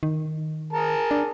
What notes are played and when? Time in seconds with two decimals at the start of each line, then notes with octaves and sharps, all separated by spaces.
0.03 D#3
0.73 G#4 A#4 A5
1.11 D4